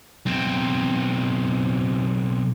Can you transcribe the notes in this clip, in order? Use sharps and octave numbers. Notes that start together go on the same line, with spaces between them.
B1 C4